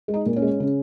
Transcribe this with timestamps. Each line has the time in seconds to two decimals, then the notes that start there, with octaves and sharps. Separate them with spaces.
0.08 G#3
0.14 D#4
0.26 A#2
0.36 C#4
0.42 G#3
0.60 C#3